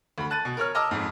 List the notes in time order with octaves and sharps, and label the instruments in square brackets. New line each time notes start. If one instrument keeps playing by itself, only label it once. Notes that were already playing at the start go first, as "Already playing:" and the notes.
[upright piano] D2 B5
A5 F#6 A6 D#7
B2
A#4 C#5 F6
D#5 A5 A#5 D6 E6 F6
F2 G#2